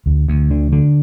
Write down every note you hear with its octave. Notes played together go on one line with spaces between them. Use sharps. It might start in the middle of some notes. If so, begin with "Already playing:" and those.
D2
D2
D3
D3